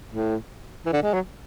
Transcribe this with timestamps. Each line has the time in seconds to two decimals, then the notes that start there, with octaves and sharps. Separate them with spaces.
0.11 A2
0.86 E3
0.93 D3
1.03 G#3
1.13 F#3